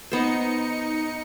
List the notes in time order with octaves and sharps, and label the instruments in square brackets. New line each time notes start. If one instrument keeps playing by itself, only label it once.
[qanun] B3 C5 [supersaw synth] D#4 C#7